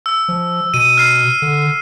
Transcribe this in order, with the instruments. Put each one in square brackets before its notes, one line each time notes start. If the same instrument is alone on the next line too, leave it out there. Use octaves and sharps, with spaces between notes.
[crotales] E6
[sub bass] F3
[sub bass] B2 [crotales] D#7
[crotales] F6 C7
[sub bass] D3